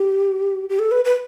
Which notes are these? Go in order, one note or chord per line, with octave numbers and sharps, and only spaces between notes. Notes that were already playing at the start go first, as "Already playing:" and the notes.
Already playing: G4
G4
A4
B4
B4